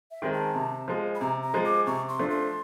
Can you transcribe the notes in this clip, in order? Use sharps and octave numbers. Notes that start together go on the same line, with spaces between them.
E5
D#3 G#3 C4
A5
C3
F3 G#3
B5
C3 A#5
A#5
F3 G#3
D6
C3 C#6
C6
F3 A3 D4
C6